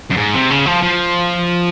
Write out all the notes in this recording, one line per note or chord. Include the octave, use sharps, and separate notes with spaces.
F#2
G#2
C3
C#3
F3
F3